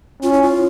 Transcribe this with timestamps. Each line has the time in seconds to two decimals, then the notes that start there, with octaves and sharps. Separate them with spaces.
0.23 C#4 F4
0.33 E4
0.42 F4